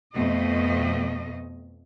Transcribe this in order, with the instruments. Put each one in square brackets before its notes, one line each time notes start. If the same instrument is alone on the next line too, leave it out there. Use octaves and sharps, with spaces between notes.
[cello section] F2 B2 A3 D#5